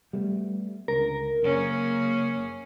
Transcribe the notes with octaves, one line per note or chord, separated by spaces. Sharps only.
G3 A3 B3
C#2 D3 A#4
F#1 A#3 C#4 G#4